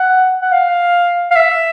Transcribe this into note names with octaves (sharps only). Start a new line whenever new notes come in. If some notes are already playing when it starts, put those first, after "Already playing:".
Already playing: F#5
F#5
F5
F5
E5